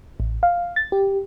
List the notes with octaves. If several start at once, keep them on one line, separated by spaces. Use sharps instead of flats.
A1
F5
A6
G4